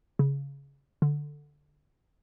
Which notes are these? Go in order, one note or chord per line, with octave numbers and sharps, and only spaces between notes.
C#3
D3